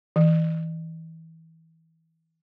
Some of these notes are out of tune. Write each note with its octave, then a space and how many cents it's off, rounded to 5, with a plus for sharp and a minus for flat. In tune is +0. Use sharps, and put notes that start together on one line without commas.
E3 -25